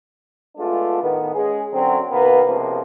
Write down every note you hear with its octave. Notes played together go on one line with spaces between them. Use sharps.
G#3 A3 B3 D4 F4
A2 D#3 B3
G#3 C#4 G#4
F#2 D3 F#3 C4
D#2 C3 A#3 B3 B4
C#2 C3 F3 A#3 B3